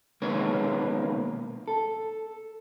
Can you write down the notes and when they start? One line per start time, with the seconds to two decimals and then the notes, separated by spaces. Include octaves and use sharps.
0.22 B1 D#3 G#3 A#3 B3 C#5
1.68 A4